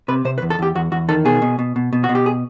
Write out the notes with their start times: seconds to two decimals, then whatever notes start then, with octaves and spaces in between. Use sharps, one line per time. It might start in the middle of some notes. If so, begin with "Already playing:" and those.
0.08 C3 B4
0.25 C3 C5
0.38 B4
0.42 E2
0.50 A4
0.59 E2 G4
0.75 E2 F#4
0.92 E2 F#4
1.09 D#3 A4
1.25 B2 G#4
1.42 B2
1.59 B2
1.76 B2
1.93 B2
2.04 F#4
2.09 B2
2.15 G4
2.26 G#4